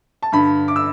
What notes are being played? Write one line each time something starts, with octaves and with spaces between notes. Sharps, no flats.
A5
G2 D3 B5
D6
E6